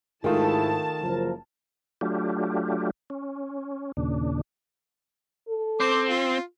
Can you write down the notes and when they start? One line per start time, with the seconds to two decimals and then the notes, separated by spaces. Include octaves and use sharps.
0.24 G#2 D#3 A3 E4 F4 G#4 A5
1.01 F#1 F3 A#4
2.01 F#3 A3 D4 F4 G4
3.10 C#4
3.97 D#2 A#2 C#3 D4
5.48 A4
5.80 C4 C5 D6
6.09 F4